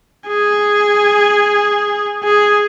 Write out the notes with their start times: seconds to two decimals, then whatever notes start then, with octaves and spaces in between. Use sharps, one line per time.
0.28 G#4
2.24 G#4